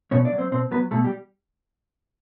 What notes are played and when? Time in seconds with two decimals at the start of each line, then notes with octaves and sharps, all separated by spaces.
0.11 B2 C#4 C#5
0.25 D4 D5
0.32 F#3
0.38 C4 C5
0.51 B2 C4 C5
0.71 F#3 B3 B4
0.91 B2 A3 A4
1.04 G3 G4